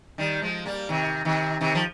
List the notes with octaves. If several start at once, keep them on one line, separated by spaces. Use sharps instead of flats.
D#3 G3
F3 G#3
G3 A#3
C3 D#3
C3 D#3
C3 D#3
F3